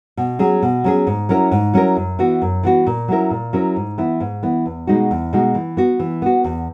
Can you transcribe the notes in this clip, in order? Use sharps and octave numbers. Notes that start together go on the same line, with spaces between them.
B2
F#3 C#4 G#4
B2
F#3 C#4 G#4
G#2
F#3 C#4 E4 A#4
G#2
F#3 C#4 E4 A#4
F#2
E3 B3 F#4
F#2
E3 B3 F#4
A#2
F#3 C#4 E4 A#4
A#2
F#3 C#4 E4 A#4
G#2
E3 B3 E4
G#2
E3 B3 E4
E2
B2 G#3 D#4 F#4
E2
B2 G#3 D#4 F#4
E3
B3 F#4
E3
B3 F#4
E2